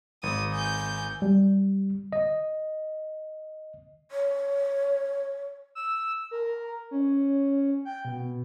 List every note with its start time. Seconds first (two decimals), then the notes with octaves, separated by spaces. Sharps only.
0.23 G#1 D#6
0.53 G#5 G6
1.22 G3
2.13 D#5
4.11 C#5
5.75 E6
6.31 A#4
6.91 C#4
7.85 G5
8.05 B2